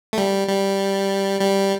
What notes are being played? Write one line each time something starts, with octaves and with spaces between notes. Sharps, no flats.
A3
G3
G3
G3